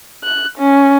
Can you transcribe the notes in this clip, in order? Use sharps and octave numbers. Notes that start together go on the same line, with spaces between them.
F#6
C#4